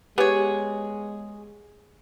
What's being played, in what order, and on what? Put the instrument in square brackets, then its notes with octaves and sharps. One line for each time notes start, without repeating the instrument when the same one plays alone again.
[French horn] G#3 [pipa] B3 C#5 [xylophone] G4 [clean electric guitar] G#4